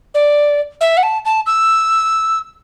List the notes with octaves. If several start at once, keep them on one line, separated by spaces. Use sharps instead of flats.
D5
E5
F#5
A5
A5
E6